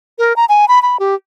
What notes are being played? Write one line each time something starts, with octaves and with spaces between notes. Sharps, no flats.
A#4
A#5
G#5
B5
B5
G4